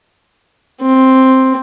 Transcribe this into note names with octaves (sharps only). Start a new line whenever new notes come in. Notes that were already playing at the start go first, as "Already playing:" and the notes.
C4